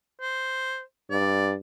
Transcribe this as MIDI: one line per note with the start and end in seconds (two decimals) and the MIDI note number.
0.21 0.81 72
1.11 1.56 43
1.11 1.53 74